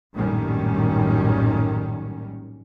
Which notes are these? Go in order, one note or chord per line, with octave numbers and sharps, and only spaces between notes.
A#1 F#2 A2 D#3 G3 C#4